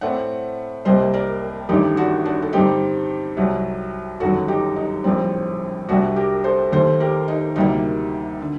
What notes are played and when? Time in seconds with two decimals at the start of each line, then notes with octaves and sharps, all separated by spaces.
0.01 A2 A3 C4 D5 F#5
0.85 C2 C3 G3 A#3 C5 D#5
1.13 A#4 D5
1.69 A1 G2 D#3 A3 D#4 G4
1.97 D4 F#4
2.25 D4 F#4
2.42 A4
2.53 G2 D3 G3 C4 D#4 G4
3.37 C2 C3 F#3
4.20 G1 F#2 D#3 F#3 F#4 A4
4.48 D#4 G4
4.76 D#4
5.04 A#1 A2 G3 C4
5.89 C2 C3 G3 D4 F#4
6.16 G4 A#4
6.44 A4 C5
6.72 D#2 D#3 A3 A4 C5
7.00 G4 A#4
7.28 D#4
7.56 D2 C3 G3 A#3 D#4
8.40 D3